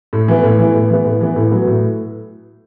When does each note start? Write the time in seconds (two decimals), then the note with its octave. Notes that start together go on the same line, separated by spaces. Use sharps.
0.13 A2
0.28 E3 B3
0.43 A2
0.59 E3 B3
0.74 A2
0.90 E3 B3
1.05 A2
1.21 E3 B3
1.36 A2
1.51 F#3 B3
1.67 A2